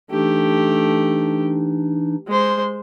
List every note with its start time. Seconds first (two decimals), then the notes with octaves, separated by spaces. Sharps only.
0.11 E3 A3 D4 D#4 G4
2.28 G#3 C5